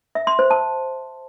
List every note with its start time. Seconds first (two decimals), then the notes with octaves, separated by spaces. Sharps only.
0.15 E5
0.27 C6
0.39 C5
0.51 A5